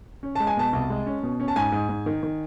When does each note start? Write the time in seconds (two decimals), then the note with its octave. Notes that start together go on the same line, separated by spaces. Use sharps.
0.23 C#4
0.35 G#3 A5
0.47 G#5
0.57 B2 A5
0.73 C2
0.90 G#3
1.06 C#4
1.23 B2
1.40 C#4
1.48 A5
1.56 G#2 G#5
1.72 G#2
1.89 G#2
2.06 D#3
2.23 D#3